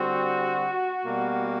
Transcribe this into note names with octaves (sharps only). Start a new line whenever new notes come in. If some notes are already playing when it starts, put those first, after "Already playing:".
Already playing: D3 G3 C4 F#4
B2 G3 A#3